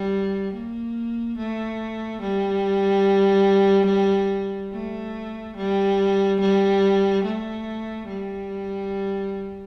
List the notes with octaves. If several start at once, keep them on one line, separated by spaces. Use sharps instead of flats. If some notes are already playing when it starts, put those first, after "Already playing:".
Already playing: G3
A#3
A3
G3
A3
G3
G3
A3
G3